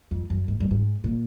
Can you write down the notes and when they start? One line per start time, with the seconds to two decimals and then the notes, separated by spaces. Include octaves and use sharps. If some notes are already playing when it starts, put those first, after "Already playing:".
0.11 F2
0.30 F#2
0.48 G#2
0.60 G2
0.71 G#2
1.04 A#2